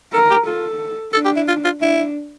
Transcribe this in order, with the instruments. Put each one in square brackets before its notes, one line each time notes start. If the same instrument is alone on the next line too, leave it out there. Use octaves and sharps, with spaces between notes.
[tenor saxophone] A4 [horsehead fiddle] A#4
[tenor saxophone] G4
[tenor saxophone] F4 [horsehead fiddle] A4
[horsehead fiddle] D4 [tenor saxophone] A4
[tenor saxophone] G4
E4
F4
F4
[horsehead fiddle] D4 [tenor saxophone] E4